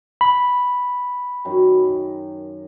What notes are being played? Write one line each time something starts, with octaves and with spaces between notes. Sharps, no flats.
B5
F#2 D#3 F#3